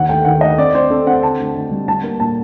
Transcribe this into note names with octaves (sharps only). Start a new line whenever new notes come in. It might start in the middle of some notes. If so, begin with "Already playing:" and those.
Already playing: D#2 F#5
A3 G5
D#3 F#5
A3 D#5
C4 D5
C4 C5
C4 A4
C4 F#5
D3 A5
D2
D2
G3
G3 A5
A#3
A#2 A5